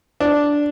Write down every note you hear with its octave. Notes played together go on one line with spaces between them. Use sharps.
D4